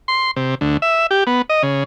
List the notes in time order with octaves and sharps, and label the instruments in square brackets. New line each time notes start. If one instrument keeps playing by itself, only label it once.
[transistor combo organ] C6
C3
D2
E5
G4
B3
D#5
C#3